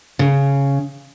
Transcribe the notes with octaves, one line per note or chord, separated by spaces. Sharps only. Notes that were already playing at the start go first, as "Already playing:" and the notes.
C#3